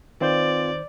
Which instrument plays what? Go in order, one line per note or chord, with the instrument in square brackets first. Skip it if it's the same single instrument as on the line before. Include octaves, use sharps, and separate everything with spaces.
[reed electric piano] D#3 C5 G6 [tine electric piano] C4 F4 B4 [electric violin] D5